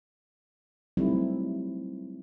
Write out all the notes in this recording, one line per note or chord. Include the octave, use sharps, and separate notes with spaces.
F#3 G3 A3 C4 D#4 E4